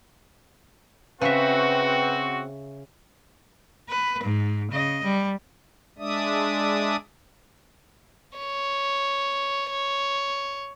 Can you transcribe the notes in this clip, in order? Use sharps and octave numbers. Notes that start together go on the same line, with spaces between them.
C#3 C4 F#4 B4 E5
B4
G#2
C#3 D#5
G3
G#3 D4 D5 E5 D#6
C#5
C#5